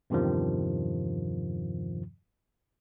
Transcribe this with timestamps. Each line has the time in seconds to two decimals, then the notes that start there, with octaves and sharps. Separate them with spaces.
0.10 E2 G2 C3 D#3 F3